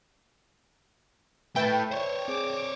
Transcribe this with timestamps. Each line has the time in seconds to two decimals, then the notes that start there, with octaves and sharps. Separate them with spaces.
1.56 A3 E4 B4 E5 G5 A5
1.91 C5 C#5
2.28 C4 G#4 D6